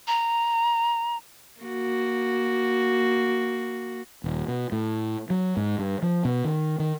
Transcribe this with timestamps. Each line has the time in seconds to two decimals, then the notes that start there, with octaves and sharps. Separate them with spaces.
0.08 A#5
1.61 A#3 F#4
4.24 D#1
4.48 B2
4.72 A2
5.30 F#3
5.57 G#2
5.79 G2
6.02 F3
6.25 B2
6.45 D#3
6.80 D#3